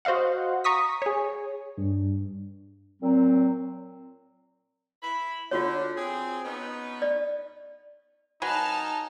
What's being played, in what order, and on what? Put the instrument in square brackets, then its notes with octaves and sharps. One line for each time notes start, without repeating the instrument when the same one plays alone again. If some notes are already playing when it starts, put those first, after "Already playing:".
[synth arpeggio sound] F#4 C5 D#5 F5 F#5
A#5 C#6 D#6 B6
G#4 C#5
[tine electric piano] G2
[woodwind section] A#2 F#3 C4
[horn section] E4 B5
[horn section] D3 [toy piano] F4 F#4 C#5
[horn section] C4 G#4
B3 C#4 D#4
[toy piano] D5
[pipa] F#3 F#4 B4 [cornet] D#4 [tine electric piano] G#5 [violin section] A5 F6